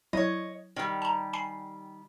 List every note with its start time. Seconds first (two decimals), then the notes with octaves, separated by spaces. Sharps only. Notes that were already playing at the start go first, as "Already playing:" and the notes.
0.13 F#3 E4 C#5 D#5
0.76 D#3 G3
1.02 A5 A#5
1.33 G#5 B5 C7